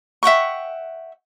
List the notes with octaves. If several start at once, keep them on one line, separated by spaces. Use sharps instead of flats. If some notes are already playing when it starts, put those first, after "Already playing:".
E5 F#5 G5 C#6